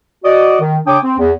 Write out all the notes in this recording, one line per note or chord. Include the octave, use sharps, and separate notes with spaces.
F#4 D5 D#5
D#3
C#3 D4 C#5 G5 D6 D#6
C4
E2